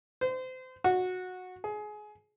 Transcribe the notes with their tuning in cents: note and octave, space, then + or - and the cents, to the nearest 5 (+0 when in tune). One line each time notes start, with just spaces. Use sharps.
C5 -30
F#4 -15
G#4 +20